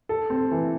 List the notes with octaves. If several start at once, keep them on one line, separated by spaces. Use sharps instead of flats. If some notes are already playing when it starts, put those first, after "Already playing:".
A4
C4
E3